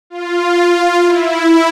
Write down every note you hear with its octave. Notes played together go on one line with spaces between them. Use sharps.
F4
E4